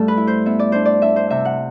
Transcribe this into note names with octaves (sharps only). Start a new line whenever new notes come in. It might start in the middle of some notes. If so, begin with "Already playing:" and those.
Already playing: G2 A3 A4
B4
E4
C5
B3 E5
D5
D4 C5
D5
D4 E5
C5
C3 E5
F#5